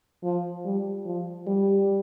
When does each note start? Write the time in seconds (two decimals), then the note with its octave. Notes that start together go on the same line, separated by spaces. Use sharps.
0.23 F3
0.65 G3
1.05 F3
1.47 G3